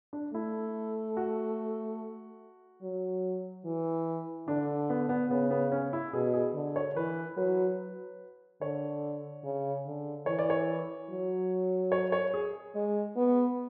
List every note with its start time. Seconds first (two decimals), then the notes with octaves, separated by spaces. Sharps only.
0.13 D4
0.34 A3 E4
1.17 F#4
2.82 F#3
3.65 E3
4.48 D3 D4
4.90 B3
5.09 B3
5.30 C#3 B3
5.51 B3
5.72 C#4
5.93 E4
6.13 B2 G#4
6.34 G#4
6.54 D3
6.76 C#5
6.96 E3 B4
7.37 F#3 B4
8.61 D3 C#5
9.44 C#3
9.86 D3
10.26 E3 C#5
10.39 D5
10.50 C#5
11.10 F#3
11.92 C#5
12.12 C#5
12.34 G#4
12.75 G#3
13.17 B3